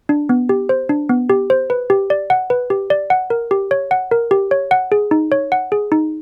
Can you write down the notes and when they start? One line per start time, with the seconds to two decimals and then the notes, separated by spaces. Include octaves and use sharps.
0.09 D4
0.29 B3
0.49 G4
0.69 C5
0.89 D4
1.09 B3
1.30 G4
1.50 C5
1.70 B4
1.90 G4
2.10 D5
2.30 F#5
2.50 B4
2.70 G4
2.90 D5
3.10 F#5
3.30 A#4
3.51 G4
3.71 C#5
3.91 F#5
4.11 A#4
4.31 G4
4.51 C#5
4.71 F#5
4.92 G#4
5.11 D#4
5.32 C#5
5.52 F#5
5.72 G#4
5.92 D#4